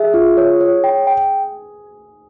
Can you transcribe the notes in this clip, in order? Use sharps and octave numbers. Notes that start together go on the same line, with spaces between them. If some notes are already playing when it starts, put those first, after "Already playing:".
Already playing: G#4 E5
F4
C#5
C#5
G5
G5